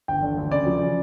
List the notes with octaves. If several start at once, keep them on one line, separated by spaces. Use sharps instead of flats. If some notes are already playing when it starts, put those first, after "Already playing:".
G1 G5
D3
D2
C#3 D5
F3
C#3